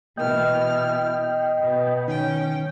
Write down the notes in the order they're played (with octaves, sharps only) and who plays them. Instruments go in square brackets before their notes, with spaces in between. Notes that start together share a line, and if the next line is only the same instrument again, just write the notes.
[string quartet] B2 E3 F6 [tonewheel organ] D#5 G5
[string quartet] B2 B3
[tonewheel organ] D#3 [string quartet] C#4 G5